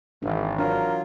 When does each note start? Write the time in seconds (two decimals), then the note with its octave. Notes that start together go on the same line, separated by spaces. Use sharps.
0.23 G#1 E3 D4
0.58 F#3 D4 F4 A#4